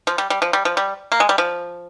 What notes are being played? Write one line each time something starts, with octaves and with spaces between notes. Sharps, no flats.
F3
G3
G3
F3
G3
F3
G3
A#3
G#3
G3
F3